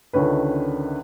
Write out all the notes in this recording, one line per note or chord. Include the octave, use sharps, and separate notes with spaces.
C#2 D3 D#3 C#4 B4